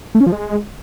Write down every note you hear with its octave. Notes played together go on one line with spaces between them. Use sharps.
A3
C#4
F3
G#3